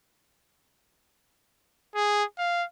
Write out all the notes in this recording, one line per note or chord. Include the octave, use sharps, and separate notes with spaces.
G#4
F5